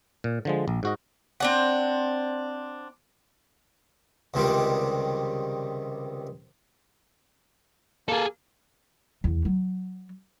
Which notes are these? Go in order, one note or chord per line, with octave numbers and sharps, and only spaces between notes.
A#2
D3 F3 G#3
A#1
G#2 F#4 D#5
C4 D4 F#5
C#2 C3 D#3 G3
A#3 G#4 A4
E2
F#3